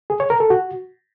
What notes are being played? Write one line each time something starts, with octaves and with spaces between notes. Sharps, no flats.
G#4
C#5
A#4
A4
F#4